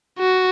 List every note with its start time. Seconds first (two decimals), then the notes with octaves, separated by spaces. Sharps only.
0.19 F#4